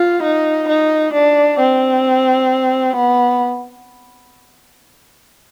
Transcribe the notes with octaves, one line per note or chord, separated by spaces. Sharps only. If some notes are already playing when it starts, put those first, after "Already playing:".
Already playing: F4
D#4
D#4
D4
C4
B3